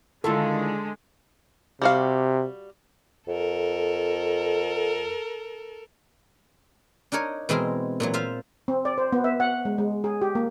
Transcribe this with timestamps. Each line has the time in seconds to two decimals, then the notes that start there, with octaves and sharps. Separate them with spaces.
0.24 D3 D#3 G#3 E4 F4 A4
1.82 C3 G3 F#4 F5
3.28 F2 A4 A#4
7.12 D4 D#4 A#4 C#5
7.49 B2 E3 G#3 C4 A#4
8.00 A#2 E3 F#3
8.14 F4 C5 E5 F5
8.68 C4
8.85 D5
8.98 C5
9.12 B3
9.24 E5
9.40 F#5
9.65 G#3
9.78 G#3
10.04 G#4
10.22 G4
10.35 A#3